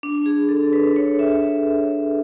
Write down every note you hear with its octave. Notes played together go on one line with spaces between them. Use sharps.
D4
G#4
A4
B4
C#5
E5